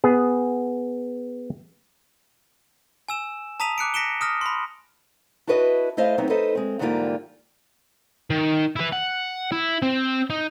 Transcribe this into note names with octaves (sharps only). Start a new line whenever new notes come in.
B3 G#4
G#5 E6 E7
A5 A#5 D#6 B6 D#7 F7
D6 F#6 C#7 D7
A#6 B6 C#7 D7 E7 G7
D#6 F6 A#6
B5 C6
D4 E4 F#4 B4 C5 D#5
A3 E4 C5 D#5 F5
F#3 B3 C4 D#4
D#4 A4 B4 C5 D#5
G#3 C4
G#2 D3 E3 G3 A#3 F4
D#3
E4 B4
F#5
E4
C4
D#4